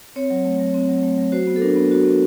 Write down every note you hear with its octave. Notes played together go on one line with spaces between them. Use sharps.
C4 C#5
F#3
A3
F#3
C4
F#3
A3
F#3
F#4 C5
B3
A4
D4 A#4
B3
F#4
B3